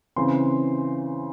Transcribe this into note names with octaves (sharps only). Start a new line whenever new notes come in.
C#3 E3 C4 C6